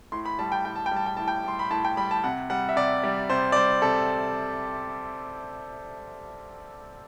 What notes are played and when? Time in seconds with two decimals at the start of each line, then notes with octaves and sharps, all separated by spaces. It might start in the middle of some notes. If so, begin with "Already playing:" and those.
0.12 A2 C6
0.26 B5
0.39 G3 A5
0.52 G5
0.65 A2 G5
0.75 A5
0.86 G5
0.91 G3
0.96 A5
1.06 G5
1.17 A2 A5
1.28 G5
1.44 G3 C6
1.59 B5
1.71 A2 A5
1.85 G5
1.97 G3 B5
2.11 A5
2.24 C3 F#5
2.50 G3 F#5
2.69 E5
2.76 C3 D5
3.03 G3
3.30 C3 C5
3.52 D5
3.56 G3 C5
3.82 C3 A4